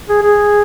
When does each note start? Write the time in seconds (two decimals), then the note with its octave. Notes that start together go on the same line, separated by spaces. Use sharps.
0.09 G#4
0.23 G#4